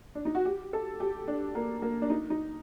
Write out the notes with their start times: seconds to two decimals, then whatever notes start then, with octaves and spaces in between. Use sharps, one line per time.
0.15 D4
0.25 D#4
0.35 F#4
0.45 G4
0.73 A4
1.00 G4
1.28 D4
1.55 A#3
1.82 A#3
2.02 D4
2.10 D#4
2.30 D#4